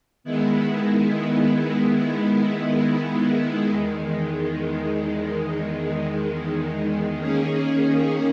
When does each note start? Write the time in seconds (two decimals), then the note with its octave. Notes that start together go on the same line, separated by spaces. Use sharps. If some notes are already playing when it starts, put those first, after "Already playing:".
0.24 D#3 G#3 B3 E4
3.71 E2 D#3 G#3
7.18 D#3 A#3 C#4 G#4